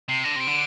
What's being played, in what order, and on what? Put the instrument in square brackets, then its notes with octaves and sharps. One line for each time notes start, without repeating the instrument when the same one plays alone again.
[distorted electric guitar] C3 [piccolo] C7
[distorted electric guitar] D3 [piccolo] A#6
[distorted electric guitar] C3 [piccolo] D7
[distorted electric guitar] D3